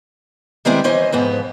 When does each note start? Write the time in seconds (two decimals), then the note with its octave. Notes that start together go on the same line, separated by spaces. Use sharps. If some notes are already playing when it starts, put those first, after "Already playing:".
0.65 D#3 G3 G#3 B3 C4 E4
0.84 E3 C#4 C5 D#5
1.12 F2 G#2 B3